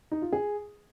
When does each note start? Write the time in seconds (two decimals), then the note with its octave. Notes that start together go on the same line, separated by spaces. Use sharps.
0.11 D#4
0.22 F4
0.33 G#4